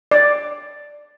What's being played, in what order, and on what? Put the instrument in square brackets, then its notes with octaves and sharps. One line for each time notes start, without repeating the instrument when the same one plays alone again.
[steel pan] D5